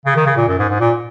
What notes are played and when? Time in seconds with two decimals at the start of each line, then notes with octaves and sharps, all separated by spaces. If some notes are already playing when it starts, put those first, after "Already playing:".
0.06 C#3
0.16 D#3
0.26 C#3
0.37 A#2
0.48 F#2
0.59 G#2
0.69 G#2
0.80 A#2